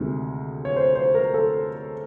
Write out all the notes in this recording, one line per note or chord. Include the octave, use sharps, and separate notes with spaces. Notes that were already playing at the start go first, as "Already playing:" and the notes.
Already playing: D2 C3 D#3 G#3
C#5
C5
C5
A#4
A4